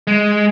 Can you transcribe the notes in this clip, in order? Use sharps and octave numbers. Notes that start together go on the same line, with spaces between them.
G#3